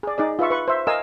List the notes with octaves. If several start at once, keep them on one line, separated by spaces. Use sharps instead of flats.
G#4 D5
D#4 G#4 D5
F4 B4 E5 C#6
B4 C#6
C5 E5
A#4 D#5 F5 G#5 E6